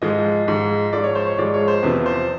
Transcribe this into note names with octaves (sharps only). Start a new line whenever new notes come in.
G#2 F3 G#3 D#5
G#2 F3 G#3
G#2 F3 G#3 D5
C#5
C5
C#5
G#2 F3 G#3 D5
C#5
C5
E2 C3 F3 B4
C5